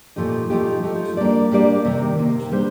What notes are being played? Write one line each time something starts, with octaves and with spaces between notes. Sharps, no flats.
A#2 F3 A3 D#4 G4
F3 A3 D#4 G4
F3 A3 D#4 G4
G3 A#3 D4 G4 D5
G3 A#3 D4 G4 D5
C3 D#3 A#3
C3 D#3 A#3
G3 D4 G4 C5